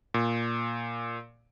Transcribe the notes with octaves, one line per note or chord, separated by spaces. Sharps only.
A#2